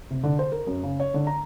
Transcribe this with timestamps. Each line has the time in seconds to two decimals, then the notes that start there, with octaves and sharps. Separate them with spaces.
0.11 C3
0.23 D3
0.39 C5
0.52 A#4
0.67 F#2
0.83 C#3
1.00 C#5
1.14 D3
1.27 A#5